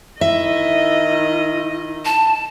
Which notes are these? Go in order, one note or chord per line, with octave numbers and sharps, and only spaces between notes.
D#3 E4 D#5 E5
A5